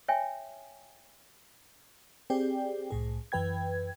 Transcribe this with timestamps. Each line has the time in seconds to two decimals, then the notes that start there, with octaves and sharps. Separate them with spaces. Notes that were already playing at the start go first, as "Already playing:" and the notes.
0.08 C#5 E5 G5 G#5
2.30 C4 G4 G#4 D5 G5
2.91 C2 A2 G#4
3.32 F#2 E3 B4 G5 G#6